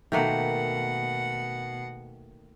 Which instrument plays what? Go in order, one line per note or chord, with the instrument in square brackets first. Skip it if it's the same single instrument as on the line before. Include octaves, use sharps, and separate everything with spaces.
[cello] B2 F#5 [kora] D#3 A3 A#3